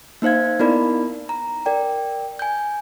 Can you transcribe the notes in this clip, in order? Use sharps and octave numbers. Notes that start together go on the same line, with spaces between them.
A#3 D#4 C5 F5 G#6
B3 D#4 E4 A#4 D5 B5
A#5
A#4 D5 G5
G#5 G6